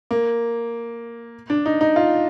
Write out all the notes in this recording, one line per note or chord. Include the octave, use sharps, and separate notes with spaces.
A#3
D4
D#4
D#4
F4